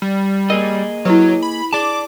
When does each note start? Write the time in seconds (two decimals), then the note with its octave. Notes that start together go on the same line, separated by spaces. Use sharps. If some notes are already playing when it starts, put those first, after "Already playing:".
0.02 G3
0.50 A#3 G#4 A#4 D#5
1.05 F#3 E4 G4 B4
1.43 B5
1.73 G#4 D5 A5 D6